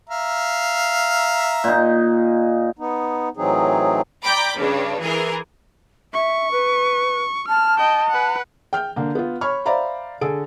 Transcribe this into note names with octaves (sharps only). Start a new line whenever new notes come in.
E5 F5 A#5
A#2 D#4
B3 D#4
A2 E3 F#3 C4 D#4 G#4
D5 G5 A#5 B5 D6
G2 C#3 D4
E3 G#4 A#4
E5 C#6
B4
A5 F6
D#5 G5
B4 F#5
G5 F6 G6
D3 A#3
B3 F4
C#5 B5 C#6 F6
C5 D5 E5 F5 A#5 B5
D3 G#4 A4 D7